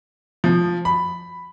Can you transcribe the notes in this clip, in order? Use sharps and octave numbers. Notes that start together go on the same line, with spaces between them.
F3
B5